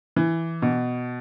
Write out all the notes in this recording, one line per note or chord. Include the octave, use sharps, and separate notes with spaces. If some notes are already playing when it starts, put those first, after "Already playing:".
E3
B2